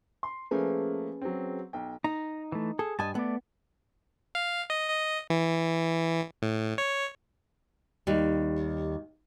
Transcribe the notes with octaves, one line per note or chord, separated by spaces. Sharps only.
C6
F3 A3 A#3 C#4 G#4 B4
F#3 C4
B1 G5
D#4 A#5
E3 A3
G#4 A4
G2 D#5 G#5 A5
A3 B3 D5
F5
D#5
D#5
E3
A2
C#5
D#2 G3